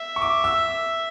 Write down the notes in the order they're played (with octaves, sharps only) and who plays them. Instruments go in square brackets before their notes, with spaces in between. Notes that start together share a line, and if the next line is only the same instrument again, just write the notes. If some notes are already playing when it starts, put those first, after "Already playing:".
Already playing: [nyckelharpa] E5
[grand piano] C#6
D6
E6